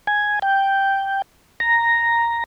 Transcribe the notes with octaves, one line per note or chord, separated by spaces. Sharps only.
G#5
G5
A#5